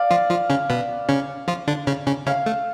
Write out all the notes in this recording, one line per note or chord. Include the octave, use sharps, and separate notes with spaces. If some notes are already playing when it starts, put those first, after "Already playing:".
Already playing: D5 F5
F3 F4
F3 F4
C#3 C#4
B2 B3
C#3 C#4
F3 F4
D3 D4
C#3 C#4
C#3 C#4
C#3 C#4 F5
A3